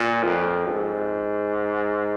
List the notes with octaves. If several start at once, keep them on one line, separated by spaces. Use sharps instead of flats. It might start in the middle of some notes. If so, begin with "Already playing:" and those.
Already playing: A#2
F2
G#2